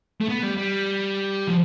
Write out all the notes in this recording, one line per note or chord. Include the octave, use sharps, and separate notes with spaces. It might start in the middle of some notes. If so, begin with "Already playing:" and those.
A3
B3
G3
G3
F3